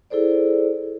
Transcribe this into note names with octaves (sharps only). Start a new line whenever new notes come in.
E4 G#4 A4 C5 D5